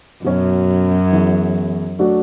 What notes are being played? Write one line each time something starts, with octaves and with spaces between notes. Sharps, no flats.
F#2 B2 F#3 C#4
E3 B3 E4 G#4
F#3 A3 D4 F#4